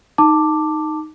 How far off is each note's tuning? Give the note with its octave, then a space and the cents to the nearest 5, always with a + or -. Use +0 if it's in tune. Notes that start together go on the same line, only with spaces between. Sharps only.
D#4 +0 A5 +15 D6 +0